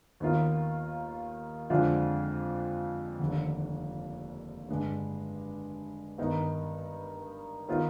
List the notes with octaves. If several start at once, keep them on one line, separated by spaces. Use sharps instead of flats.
D#2 D#3 B3 F4
F2 D3 G#3 D4 F4
F1 D#2 D3
G2 D3 G#3 D4
G2 D#3 B3 D#4
D#3 B3 F4